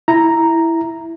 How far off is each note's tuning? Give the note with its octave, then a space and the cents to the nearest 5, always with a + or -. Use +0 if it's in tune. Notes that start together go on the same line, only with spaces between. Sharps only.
E4 +0 A#5 +0